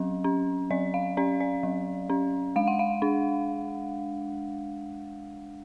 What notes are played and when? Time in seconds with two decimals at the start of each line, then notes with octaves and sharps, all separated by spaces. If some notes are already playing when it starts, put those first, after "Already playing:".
Already playing: F#3 C#4
0.24 C#4
0.71 F#3 D5
0.94 F5
1.17 C#4 D5
1.40 D5
1.63 F#3
2.10 C#4
2.56 G#3 F5
2.67 F#5
2.79 F5
3.02 D4